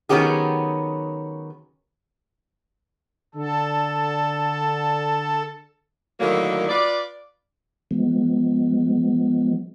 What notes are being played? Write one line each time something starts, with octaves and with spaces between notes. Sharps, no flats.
D#3 F#3 B3 C#4 G4 G#4
D3 A4
A2 D3 D#3 F#3 A#3
F4 B4 D5
F3 G#3 B3